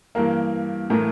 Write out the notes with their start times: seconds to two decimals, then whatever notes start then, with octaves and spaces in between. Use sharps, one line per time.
0.15 G2 E3 A#3 A#4
0.90 A2 E3 A3 A#4